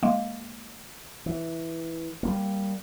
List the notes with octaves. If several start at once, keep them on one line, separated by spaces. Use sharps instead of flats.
G#3 A#3
E3
G3 G#3 A#3